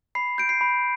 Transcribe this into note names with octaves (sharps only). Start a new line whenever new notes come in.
B5 C7
G6 D7
C7
B5